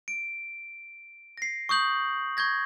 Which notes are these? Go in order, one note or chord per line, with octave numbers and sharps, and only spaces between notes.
D7
A#6 C7
C#6 D#6 G6 F#7
C#6 G6 G#6 A#6